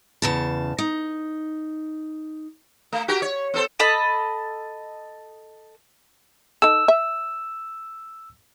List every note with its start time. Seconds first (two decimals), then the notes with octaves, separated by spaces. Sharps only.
0.22 E2 C#3 A5
0.78 D#4
2.92 A3
3.08 F#4 G4 A#4
3.22 C#5
3.54 B3 A4 C5
3.80 A4 D#5 B5
6.62 D#4 A4 E6
6.88 E5